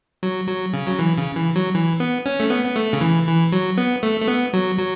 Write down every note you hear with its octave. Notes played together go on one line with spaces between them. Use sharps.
F#3
F#3
C#3
F#3
E3
C#3
E3
F#3
E3
B3
C#4
A3
B3
B3
A3
C#3
E3
E3
F#3
B3
A3
A3
B3
F#3
F#3